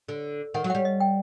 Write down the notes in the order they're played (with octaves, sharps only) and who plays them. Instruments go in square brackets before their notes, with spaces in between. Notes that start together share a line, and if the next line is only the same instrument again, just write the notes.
[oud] D3
[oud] D#3 [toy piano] F#5
[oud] F#3
[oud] G3 [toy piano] F#5
[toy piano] D#5
G5